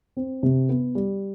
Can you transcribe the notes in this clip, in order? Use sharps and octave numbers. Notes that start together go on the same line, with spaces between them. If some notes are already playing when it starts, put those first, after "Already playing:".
C4
C3
B3
G3